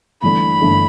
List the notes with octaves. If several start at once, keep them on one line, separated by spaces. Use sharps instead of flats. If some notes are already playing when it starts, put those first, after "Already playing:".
G1 G2 E3 A3 D4 B5
G1 G2 E3 A3 D4